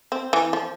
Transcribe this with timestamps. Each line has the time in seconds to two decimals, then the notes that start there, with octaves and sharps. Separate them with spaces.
0.12 C4
0.33 E3
0.53 F3